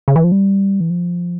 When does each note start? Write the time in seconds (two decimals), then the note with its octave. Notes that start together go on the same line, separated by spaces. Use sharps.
0.08 C#3
0.16 E3
0.24 F3
0.32 G3
0.80 E3
0.90 F3